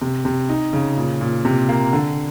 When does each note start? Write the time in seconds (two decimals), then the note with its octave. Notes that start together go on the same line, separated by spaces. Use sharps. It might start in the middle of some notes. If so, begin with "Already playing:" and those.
0.02 C3
0.25 C3
0.49 D#4
0.73 C#3
0.97 A#2
1.21 A#2
1.45 C3
1.69 A#3
1.93 D3